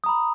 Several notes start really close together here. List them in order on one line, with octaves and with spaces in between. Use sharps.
D#6 A#5 B5